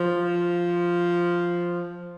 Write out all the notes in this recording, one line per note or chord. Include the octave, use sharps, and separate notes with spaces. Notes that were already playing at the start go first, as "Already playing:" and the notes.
Already playing: F3